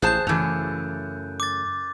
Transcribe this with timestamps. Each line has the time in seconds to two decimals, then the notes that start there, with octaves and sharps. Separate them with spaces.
0.02 A1 G#4 C5 A5 F#6 G6
0.27 F#2 C#3 E3 A3
1.40 D6 A6